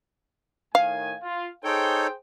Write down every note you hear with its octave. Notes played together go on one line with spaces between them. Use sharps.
A2 D#3 F5 G#5
F4
D#4 G#4 A4 C5 C#5 G5